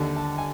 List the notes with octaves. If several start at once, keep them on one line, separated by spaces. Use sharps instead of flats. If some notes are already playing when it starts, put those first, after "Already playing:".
Already playing: D#2 D3
A5
G#5